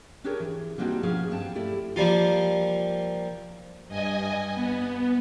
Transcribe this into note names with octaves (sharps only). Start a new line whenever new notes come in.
C4 D4 G4 G#4 A#4 C#5
E3
G3 A#3 C4 D4 D#4 F#4
B2 F3 C#4 G#4 F5
E2 G2 B3 C4 G4 A5
A3 E4 G4 D5
F3 G3 A#3 F4
G2 D#5 G#5
B3